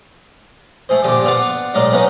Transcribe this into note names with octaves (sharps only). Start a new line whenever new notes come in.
A3 E4 G#4 C5
A#1 G2 D3 G4 G#5 D6
B3 F4 D5 F5 F#5
B1 A2 G#3 A#4 D5 D#5
A3 B3 C#4 D#4 A#4 B4